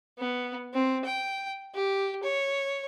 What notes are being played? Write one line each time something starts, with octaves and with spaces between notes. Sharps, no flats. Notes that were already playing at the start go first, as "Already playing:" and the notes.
B3
C4
G5
G4
C#5